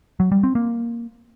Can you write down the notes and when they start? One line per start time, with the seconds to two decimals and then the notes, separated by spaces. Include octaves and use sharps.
0.20 F#3
0.32 G3
0.43 C4
0.55 A#3